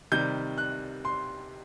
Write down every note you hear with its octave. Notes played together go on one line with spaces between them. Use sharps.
C3 D#3 G3 G6
F#6
C6